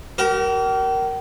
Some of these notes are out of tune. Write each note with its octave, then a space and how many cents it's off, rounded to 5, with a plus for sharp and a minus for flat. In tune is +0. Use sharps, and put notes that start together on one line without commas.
G4 -45 A#4 +0